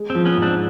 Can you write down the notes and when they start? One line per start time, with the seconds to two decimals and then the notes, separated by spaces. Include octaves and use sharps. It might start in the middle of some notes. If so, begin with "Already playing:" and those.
Already playing: G#3
0.10 C4
0.15 F3
0.25 B3 C#4
0.37 G#2
0.42 C4 D4